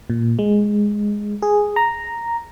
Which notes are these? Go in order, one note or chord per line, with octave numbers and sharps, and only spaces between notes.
A#2
G#3
G#4
A#5